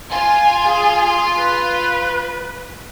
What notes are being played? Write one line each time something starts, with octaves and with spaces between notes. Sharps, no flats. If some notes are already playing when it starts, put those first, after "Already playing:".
F4 G#5
G#4
B4